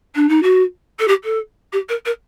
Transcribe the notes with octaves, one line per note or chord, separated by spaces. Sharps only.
D4
D#4
F#4
A4
G4
A4
G4
A#4
A#4